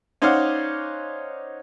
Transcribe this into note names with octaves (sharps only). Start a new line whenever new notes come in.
C#4 D#4 C5 D5 F5 F#5